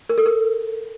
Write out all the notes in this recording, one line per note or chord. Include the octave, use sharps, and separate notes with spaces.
A#4
A4
A#4